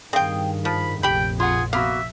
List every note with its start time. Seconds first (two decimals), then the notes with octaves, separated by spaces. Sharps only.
0.13 G2 D#3 C4 G#4 F5 G5
0.65 F3 B5
1.03 F1 A#1 G4 G5 B5
1.40 F4 G#4 F#5
1.73 A#3 B3 F#4 E5 F5